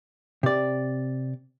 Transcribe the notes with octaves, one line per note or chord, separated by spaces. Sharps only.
C3 D5